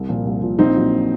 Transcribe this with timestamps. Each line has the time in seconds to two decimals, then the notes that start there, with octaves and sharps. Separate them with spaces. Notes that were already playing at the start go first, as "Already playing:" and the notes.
Already playing: C2
0.09 A#2 F3
0.25 C2
0.42 A#2 F3
0.59 A#1 C4 D#4
0.75 A#2 F#3